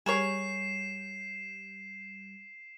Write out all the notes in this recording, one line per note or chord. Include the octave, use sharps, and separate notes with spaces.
G3 G#4 A#4 C#5 C7 E7